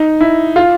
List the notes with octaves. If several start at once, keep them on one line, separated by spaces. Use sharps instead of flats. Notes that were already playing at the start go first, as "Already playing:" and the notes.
Already playing: D#4
E4
F4